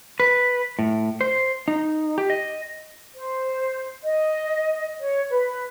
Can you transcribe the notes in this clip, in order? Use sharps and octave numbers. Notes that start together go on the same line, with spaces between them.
B4
A2
C5
D#4
G4
D#5
C5
D#5
C#5
B4